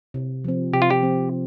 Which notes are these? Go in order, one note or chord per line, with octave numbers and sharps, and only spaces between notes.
C3
F3 C4
C3 G4
F4
G4
F3 C4